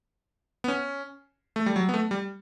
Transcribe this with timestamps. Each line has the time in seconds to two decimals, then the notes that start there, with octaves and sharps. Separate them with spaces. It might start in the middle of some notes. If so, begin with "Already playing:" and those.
0.64 B3
0.68 C#4
1.56 A3
1.66 G3
1.76 F#3
1.89 B3
1.94 A3
2.11 G3